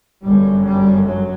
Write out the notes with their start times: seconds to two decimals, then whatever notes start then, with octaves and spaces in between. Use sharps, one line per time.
0.24 G1 G3
0.29 F#2
0.65 G3
1.06 F#3